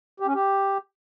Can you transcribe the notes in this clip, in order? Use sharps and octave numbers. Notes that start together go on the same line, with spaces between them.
G4
C#4
G4